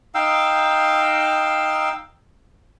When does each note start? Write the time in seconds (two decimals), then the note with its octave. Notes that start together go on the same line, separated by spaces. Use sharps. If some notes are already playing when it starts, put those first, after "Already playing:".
0.15 D#4 F5 G5 E6